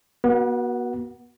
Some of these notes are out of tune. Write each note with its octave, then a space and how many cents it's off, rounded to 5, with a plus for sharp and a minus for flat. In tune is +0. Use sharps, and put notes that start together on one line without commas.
B3 -45 F#4 +0 F#5 +0